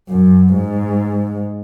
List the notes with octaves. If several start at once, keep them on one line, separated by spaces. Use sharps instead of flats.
F#2
G#2